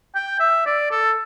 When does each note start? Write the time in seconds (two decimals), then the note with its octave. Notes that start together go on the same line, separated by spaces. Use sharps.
0.15 G5
0.40 E5
0.66 D5
0.91 A4